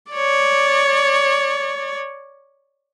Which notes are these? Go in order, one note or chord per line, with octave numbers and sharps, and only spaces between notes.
C#5 D5